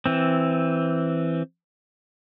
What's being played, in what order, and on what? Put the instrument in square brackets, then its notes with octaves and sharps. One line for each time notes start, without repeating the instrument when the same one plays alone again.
[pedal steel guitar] E3 C4